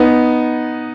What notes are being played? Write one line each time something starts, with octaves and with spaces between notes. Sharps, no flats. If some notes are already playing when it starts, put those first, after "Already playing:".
Already playing: B3 D#4